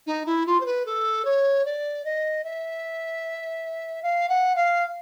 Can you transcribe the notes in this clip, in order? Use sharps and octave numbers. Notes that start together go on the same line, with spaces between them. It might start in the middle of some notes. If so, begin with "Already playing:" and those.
D#4
E4
F4
C5
B4
A4
C#5
D5
D#5
E5
F5
F#5
F5